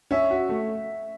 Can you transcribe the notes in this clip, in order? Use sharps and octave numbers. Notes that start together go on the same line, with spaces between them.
C#4 E5
F#4
A3